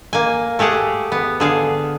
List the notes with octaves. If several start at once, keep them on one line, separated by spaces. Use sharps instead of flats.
A#3 G#5
A3 G4 G#4 F#5 A5
B3
D3 G#4 F5